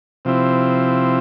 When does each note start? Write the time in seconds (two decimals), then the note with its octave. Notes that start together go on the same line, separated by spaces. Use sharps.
0.25 C3 F3 C4 E4